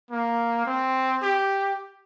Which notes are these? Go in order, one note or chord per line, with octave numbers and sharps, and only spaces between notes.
A#3
C4
G4